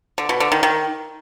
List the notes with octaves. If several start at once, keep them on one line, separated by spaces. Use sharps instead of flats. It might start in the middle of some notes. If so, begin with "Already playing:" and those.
D3
B2
D3
D#3
D#3